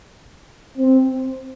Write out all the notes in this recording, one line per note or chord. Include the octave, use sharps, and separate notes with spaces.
C4